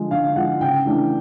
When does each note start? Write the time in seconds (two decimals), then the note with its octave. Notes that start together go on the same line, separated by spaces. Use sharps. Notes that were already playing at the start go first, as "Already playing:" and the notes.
Already playing: D3 F3 G#3
0.11 D3 F5
0.36 F3 G#3 F#5
0.61 C#3 G5
0.86 E3 A3 D4